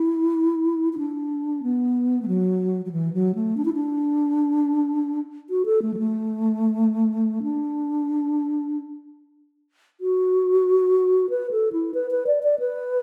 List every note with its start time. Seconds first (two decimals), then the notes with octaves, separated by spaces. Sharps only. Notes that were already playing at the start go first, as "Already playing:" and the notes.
Already playing: E4
0.93 E4
0.98 D4
1.63 B3
2.22 A3
2.28 F#3
2.85 F#3
2.92 E3
3.14 F#3
3.35 A3
3.57 D4
3.65 E4
3.73 D4
5.50 F#4
5.66 A4
5.82 A3
5.94 F#3
5.99 A3
7.43 D4
10.01 F#4
11.30 B4
11.51 A4
11.73 E4
11.94 B4
12.11 B4
12.27 D5
12.43 D5
12.59 B4